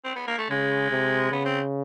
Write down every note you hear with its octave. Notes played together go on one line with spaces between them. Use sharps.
C4
B3
A#3
A3
C#3 G#3
C3
C#3 B3
C4